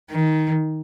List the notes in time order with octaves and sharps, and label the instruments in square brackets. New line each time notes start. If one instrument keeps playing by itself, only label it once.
[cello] D#3